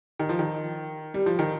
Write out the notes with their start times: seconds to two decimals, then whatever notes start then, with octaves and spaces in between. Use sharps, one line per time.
0.19 D#3
0.29 F3
0.39 D#3
1.14 G3
1.26 F3
1.39 D#3